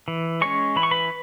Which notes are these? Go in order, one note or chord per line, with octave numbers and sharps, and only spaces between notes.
E3
G#3 C#4 C#5 C#6
E3 B5
C#6
B4 B5